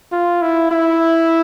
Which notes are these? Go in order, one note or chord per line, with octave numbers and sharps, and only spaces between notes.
F4
E4
E4